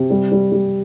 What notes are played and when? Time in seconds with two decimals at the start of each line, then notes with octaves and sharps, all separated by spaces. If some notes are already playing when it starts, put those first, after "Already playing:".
Already playing: C3
0.10 G3
0.32 G3
0.52 G3